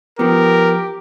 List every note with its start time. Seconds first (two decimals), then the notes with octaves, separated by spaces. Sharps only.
0.19 F3 B3 G4 A#4